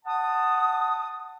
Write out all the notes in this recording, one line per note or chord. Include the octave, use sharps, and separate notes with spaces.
F#5 A5 D#6